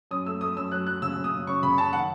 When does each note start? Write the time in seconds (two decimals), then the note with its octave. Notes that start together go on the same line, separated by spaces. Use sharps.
0.11 F#2 D#6
0.26 A3 E6
0.41 A3 D#6
0.56 F#2 E6
0.72 F#3 F#6
0.87 F#3 F#6
1.02 C#3 E6
1.17 C#3
1.24 D#6
1.33 C#3
1.47 F#2 C#6
1.63 C#3 B5
1.78 F#2 A5
1.93 D#3 F#5